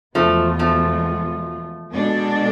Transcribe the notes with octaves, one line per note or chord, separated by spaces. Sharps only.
E2 B2 F3 G#3 A3 B3 F4
F3 A3
B2 G#3 D4 A4